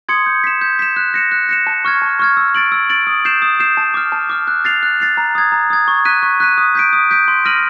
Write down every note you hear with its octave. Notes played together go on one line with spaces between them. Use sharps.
C6 D#6 G#6 C#7
G6
B6 E7
G6
B6 E7
F#6
A#6 C#7 E7
F#6
A#6 C#7 E7
A5
C#6 F6 G#6
A5
C#6 F6 G#6
E6
A6 D7 F#7
E6
A6 D7 F#7
D#6
G6 C7 E7
D#6
G6 C7 E7
A5
D6 F6
A5
D6 F6
F#6
A6 C7 F7
F#6
A6 C7 F7
A#5
D#6 G#6
A#5
D#6 G#6
C#6
F#6 B6 D#7
C#6
F#6 B6 D#7
D#6
G6 B6 D7
D#6
G6 B6 D7
C6
F6 A#6 D#7 F#7